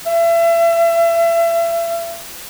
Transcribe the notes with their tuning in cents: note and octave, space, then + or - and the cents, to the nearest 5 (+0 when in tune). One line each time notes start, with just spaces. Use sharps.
E5 +35